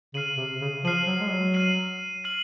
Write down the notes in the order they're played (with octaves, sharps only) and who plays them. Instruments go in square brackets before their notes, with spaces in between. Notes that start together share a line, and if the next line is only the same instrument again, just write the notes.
[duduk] C#3 [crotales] F6 C7 D#7 F#7
[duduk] C3
C#3
[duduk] F3 [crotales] F6 C7 D#7 F#7
[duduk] F#3
G#3
F#3
[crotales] F6 C7 D#7 F#7
F6 C7 D#7 F#7